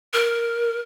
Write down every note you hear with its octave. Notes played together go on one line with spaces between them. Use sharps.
A#4